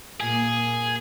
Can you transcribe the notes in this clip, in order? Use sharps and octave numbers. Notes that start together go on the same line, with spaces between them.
A#2 A#3 G#4